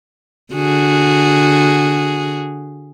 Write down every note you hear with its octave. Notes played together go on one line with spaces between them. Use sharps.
D3 F#4 G#4